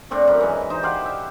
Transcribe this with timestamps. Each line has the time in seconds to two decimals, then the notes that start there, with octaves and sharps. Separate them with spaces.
0.11 A2 C4 D4 C#6
0.27 F#2 A#5 B5
0.41 E3 G#3
0.70 D#4 C5
0.83 G4 C5 F5 F#5
1.06 E5